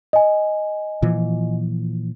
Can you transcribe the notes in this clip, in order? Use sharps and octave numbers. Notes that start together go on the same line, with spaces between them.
D#5 G#5
A#2 E3 F3